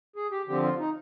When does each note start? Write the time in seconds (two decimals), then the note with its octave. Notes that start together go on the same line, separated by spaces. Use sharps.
0.16 G#4
0.31 G4
0.47 D3 F3 C4 G4
0.63 F4
0.79 D#4